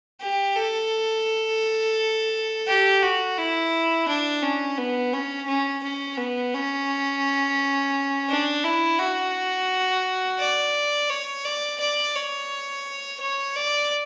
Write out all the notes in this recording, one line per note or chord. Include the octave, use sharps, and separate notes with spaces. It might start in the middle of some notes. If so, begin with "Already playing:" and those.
G4
A4
G4
F#4
E4
D4
C#4
B3
C#4
C#4
C#4
B3
C#4
D4
E4
F#4
D5
C#5
D5
D5
C#5
C#5
D5